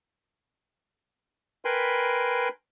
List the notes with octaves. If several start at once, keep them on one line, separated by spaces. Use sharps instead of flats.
A#4 B4 G5 G#5 B5 C6